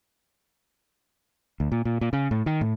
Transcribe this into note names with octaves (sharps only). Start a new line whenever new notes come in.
D2
A#2
A#2
A#2
C#3
A2
D#3
A2